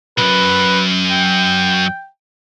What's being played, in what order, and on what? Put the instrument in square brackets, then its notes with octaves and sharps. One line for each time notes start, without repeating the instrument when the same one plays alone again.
[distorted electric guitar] C2 F#2 [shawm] B4
[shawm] G5